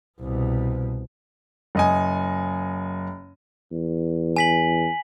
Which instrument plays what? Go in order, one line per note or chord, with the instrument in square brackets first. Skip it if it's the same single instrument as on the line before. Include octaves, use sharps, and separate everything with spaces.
[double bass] C2 B2
[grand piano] F#1 D#5 G#5
[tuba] E2
[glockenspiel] G#5 B6 F#7